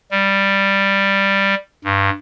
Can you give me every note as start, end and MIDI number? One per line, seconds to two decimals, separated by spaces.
0.11 1.55 55
1.84 2.10 43